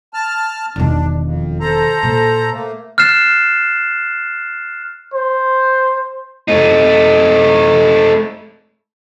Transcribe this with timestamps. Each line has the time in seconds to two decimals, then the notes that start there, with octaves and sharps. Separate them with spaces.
0.14 A5 F6
0.76 E1 D#3 D4
1.23 F2
1.60 A4 C5 A#5
2.03 A#2
2.52 A3 A#3
2.98 F6 F#6 A6 C7 E7
5.14 C5
6.48 A3 D#4